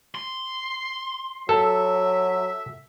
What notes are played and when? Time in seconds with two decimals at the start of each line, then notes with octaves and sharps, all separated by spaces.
0.15 C6
1.49 F#3 A4 E5